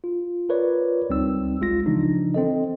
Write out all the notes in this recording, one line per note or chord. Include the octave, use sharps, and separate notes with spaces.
F4
F4 A#4 B4 C#5 D5
C#2 G3 C4 D#4 E6
A1 G#3 F4 A#6
C#3 E3 F3 D4 D#4
C4 A4 D#5